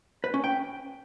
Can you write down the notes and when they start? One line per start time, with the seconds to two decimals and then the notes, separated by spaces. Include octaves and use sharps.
0.24 B4
0.34 C#4
0.44 G5